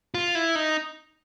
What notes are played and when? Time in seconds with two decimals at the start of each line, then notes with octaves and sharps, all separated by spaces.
0.14 F4
0.35 E4
0.55 D#4